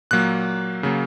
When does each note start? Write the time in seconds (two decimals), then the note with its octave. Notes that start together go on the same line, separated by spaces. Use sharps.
0.11 A#2 F#3 A#3 F#6
0.83 C#3 F#3 A#3